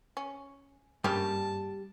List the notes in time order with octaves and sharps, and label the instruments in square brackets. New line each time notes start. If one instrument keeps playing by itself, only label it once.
[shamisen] C#4
[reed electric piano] G2 [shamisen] C#3 A#3 G4 [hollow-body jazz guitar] G3 [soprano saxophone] A5